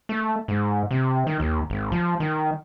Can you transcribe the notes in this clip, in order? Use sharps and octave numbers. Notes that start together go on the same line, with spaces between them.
A3
G#2
C3
D#3
D#2
G#1
F3
D#3